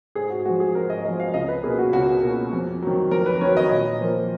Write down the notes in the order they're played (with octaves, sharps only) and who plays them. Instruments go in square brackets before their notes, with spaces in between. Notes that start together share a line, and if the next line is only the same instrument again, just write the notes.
[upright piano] G#2 G#4
F#4
F3 G#3 F#4
G#4
G#2 A#4
D#5
G#3 D#5
F3
F5
C#2 D#5
B4
A#3 G#4
B2
F#4
C#2 F#4
B2 A#3
F2
D#3 F#3
F2 A#4
B4
D#3 F#3 C#5
D#5
A#2
F3 A#3